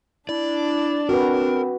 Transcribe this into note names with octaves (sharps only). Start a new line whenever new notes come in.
D4 E4 D5
C4 F#4 A#4 B4